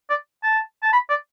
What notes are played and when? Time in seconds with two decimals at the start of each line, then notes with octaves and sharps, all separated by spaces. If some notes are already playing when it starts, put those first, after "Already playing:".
0.10 D5
0.43 A5
0.83 A5
0.93 B5
1.09 D5